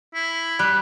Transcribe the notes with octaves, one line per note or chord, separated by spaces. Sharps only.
E4
G3 F#6